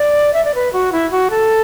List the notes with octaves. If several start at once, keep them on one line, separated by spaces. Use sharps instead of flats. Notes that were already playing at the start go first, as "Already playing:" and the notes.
Already playing: D5
E5
D5
B4
F#4
E4
F#4
A4